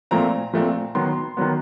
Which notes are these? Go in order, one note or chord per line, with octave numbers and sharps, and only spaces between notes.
A#2 F3 A3 C4 A#5
A#2 F3 A3 C4
D#3 F#3 B3 C6
D#3 F#3 B3